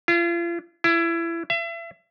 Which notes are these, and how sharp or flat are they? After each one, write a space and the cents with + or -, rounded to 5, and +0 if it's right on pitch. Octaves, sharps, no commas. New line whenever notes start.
F4 -40
E4 +25
E5 +35